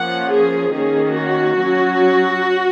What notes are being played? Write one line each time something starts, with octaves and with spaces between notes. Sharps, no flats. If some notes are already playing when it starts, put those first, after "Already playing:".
Already playing: F3 A#3 C#4 F#5
G#4
D#3 A#3 C#4 G#4
F#4
F#3 C#4